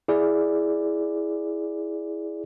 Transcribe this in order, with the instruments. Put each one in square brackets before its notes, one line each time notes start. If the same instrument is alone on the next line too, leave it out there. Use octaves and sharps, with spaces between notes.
[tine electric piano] E4 G#4 D5